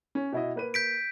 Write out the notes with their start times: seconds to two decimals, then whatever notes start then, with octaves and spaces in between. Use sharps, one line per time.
0.15 C#4
0.32 B2 E4 D#5
0.55 A#3 B4 D#7
0.74 G6 B6 D7